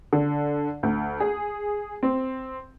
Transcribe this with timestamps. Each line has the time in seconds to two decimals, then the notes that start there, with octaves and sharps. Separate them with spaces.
0.13 D3
0.83 D2
1.20 G#4
2.03 C4